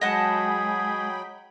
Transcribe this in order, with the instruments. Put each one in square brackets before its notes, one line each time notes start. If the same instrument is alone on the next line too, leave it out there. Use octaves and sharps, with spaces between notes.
[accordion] F#3 G5 B5 [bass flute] G#3 [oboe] G#4 [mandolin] D#5 F#5 A5